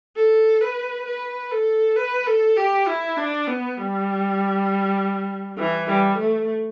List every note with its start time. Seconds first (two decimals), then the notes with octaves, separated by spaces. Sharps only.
0.16 A4
0.61 B4
1.06 B4
1.51 A4
1.96 B4
2.27 A4
2.57 G4
2.87 E4
3.17 D4
3.47 B3
3.77 G3
5.58 E3
5.87 G3
6.18 A3